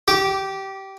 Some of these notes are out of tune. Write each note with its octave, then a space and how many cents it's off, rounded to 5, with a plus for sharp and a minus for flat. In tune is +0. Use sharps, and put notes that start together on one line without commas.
G4 -15 D6 +0